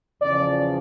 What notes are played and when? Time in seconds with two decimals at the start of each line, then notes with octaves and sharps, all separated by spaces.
0.22 E2 C#3 F3 D5